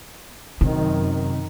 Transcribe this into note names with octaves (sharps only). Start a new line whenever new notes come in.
F#2 C3 D#3